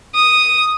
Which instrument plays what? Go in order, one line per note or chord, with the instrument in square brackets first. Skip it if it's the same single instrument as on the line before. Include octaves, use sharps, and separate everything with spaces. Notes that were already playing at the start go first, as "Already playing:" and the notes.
[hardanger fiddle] D#6